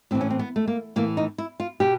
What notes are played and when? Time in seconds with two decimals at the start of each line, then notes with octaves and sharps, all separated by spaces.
0.11 A2 E3 C4
0.21 C#4
0.30 C4
0.39 B3
0.56 A3
0.67 A#3
0.96 A2 E3 A#3
1.17 D#4
1.38 E4
1.60 F4
1.80 B2 G4